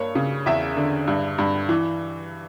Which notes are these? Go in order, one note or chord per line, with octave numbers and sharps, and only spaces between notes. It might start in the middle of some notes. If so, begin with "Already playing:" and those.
Already playing: G2 A#3 C#5
C#3
E2 E5
D3
G2
G2
E3